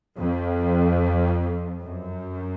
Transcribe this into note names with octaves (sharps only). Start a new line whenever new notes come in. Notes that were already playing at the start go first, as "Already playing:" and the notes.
F2
F#2